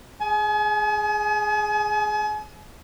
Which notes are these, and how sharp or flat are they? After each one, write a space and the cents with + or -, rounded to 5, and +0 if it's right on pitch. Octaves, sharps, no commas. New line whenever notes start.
G#4 +0 G#5 +40